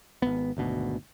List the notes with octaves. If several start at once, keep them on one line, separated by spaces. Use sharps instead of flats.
G#1 D#2 B3
G#1 D2 B2